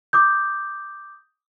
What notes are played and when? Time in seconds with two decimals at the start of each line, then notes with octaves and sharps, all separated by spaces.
0.13 D6 D#6 G6